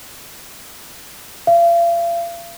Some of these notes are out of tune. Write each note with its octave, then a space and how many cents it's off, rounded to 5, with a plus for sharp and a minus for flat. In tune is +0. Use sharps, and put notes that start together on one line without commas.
F5 -40